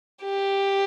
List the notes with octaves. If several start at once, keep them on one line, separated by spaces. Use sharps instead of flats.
G4